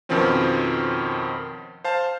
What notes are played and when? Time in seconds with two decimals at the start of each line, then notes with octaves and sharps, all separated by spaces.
0.09 F2 B2 D#3 F3 C4 C#4
1.84 C5 F5 A5